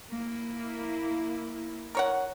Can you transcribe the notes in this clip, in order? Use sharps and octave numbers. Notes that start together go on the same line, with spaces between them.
A#3 E4
A#4 C#5 F#5